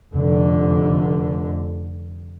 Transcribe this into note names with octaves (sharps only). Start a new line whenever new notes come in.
F1 D3